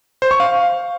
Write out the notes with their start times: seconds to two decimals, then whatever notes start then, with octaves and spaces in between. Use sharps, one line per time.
0.22 C5
0.31 C#6
0.40 F5